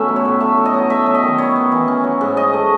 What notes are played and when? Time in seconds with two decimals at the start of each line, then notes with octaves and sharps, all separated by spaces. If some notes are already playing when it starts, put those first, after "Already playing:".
Already playing: B2 A3 C#4 B4 E5
0.09 F#3
0.16 C#5
0.25 A2
0.40 A3 E5
0.58 F#3
0.65 D#5
0.74 B2
0.90 A3 E5
1.06 F#3
1.15 D#5
1.23 D#3
1.38 E4 C#5
1.56 B3
1.72 E3
1.88 C#4
2.04 F#3
2.21 G#2
2.36 C#4 D#5
2.54 A3